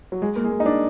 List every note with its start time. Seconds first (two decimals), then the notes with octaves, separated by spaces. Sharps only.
0.12 F#3
0.22 G#3
0.36 A#3
0.44 G#3
0.51 A#3
0.60 D#4
0.66 D4